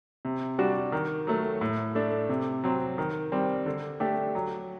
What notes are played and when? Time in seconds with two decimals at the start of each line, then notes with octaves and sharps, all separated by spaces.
0.25 C3
0.58 G3 D4 F#4
0.92 D#3
1.27 F#3 A3
1.61 A2
1.95 A3 D4
2.29 C3
2.64 F#3 C4
2.98 D#3
3.32 G3 C4
3.66 D3
4.00 A3 D4 G4
4.35 F#3